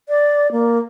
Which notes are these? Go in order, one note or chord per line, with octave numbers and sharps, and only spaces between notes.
D5
A#3